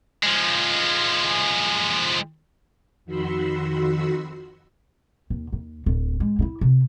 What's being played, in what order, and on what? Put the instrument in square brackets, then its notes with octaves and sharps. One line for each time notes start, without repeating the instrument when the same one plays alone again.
[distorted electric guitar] F3 G#3
[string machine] F2 D#3 F#4 B5 C6 E6
[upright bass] D#2
D#2
D1
G#3
G2 E4
C3